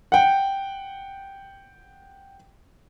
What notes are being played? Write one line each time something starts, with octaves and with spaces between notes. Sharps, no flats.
F#5 G5